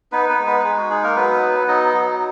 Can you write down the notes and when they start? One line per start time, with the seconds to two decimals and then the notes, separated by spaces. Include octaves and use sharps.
0.12 B3 D#4 B4
0.29 B3 B4
0.38 G#3
0.47 B3 B4
0.64 G#3 G#4
0.77 F#4
0.90 D#4 G#4
1.03 A#3 A#4
1.16 F#3 B3 B4
1.42 B3
1.68 F#3 D#4 D#5
1.94 F#3